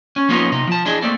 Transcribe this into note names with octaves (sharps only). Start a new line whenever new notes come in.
C#4
F3 A#3 B3 C#4 D#4 F4
C3 D#4
F3 A5
D4 E4 G#4 D#5
A3 A#3 C4 D5